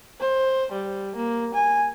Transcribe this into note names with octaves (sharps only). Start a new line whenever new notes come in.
C5
G3
A#3
G#5